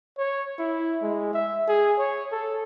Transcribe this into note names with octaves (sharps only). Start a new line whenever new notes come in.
C#5
E4
G#3
E5
G#4
C#5
A4